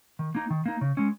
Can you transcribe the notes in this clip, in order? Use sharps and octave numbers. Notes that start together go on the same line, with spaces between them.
D#3
A#3 D#4
D#3
A#3 D#4
C#3
G#3 C#4